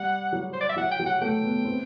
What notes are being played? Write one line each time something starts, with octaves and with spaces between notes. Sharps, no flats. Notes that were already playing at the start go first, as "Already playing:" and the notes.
Already playing: G3 F#5
F#3
C5
D5
E5
F#3 F#5
G5
F#3
F#5
A3 G5
B3
C4